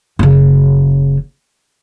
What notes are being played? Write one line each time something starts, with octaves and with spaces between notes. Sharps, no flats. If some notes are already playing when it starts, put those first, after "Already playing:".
F#1 C#3